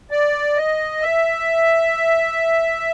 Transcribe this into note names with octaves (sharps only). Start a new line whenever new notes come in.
D5
D#5
E5